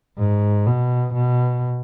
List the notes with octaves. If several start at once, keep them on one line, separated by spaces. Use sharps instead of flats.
G#2
B2
B2